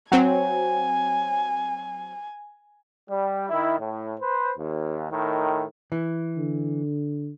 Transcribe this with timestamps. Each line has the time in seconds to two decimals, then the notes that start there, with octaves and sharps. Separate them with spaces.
0.12 F#3 C4 G#5
3.09 G3
3.50 D#3 E4
3.79 A2
4.20 B4 C5
4.58 D#2
5.11 A2 D#3
5.92 E3
6.38 D3